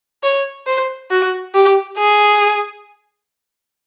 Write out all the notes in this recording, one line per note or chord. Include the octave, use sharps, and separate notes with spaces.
C#5
C5
F#4
G4
G#4